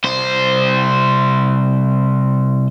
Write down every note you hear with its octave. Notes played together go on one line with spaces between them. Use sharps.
C2 C5